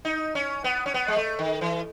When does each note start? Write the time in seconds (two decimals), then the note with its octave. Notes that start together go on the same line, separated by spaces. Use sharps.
0.05 D#4
0.35 C#4
0.64 B3
0.86 C#4
0.94 B3
1.08 G#3
1.16 A3
1.39 D#3
1.61 E3